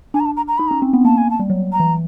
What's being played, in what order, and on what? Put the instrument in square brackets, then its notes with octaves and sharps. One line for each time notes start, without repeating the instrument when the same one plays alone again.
[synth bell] D4 [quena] G#5
[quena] A#5
A5
A#5
A#5
[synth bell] D#4 [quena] B5
[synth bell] C#4 [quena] A#5
[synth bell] C4
B3
[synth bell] A#3 [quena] A5
[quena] G#5
A5
[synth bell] G3
F#3
[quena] A#5
[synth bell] E3